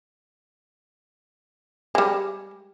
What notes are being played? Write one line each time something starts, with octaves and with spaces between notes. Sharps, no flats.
G3 G#3